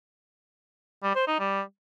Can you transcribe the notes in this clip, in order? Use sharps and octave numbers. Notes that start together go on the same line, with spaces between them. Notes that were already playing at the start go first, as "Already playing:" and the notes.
G3
C5
D#4
G3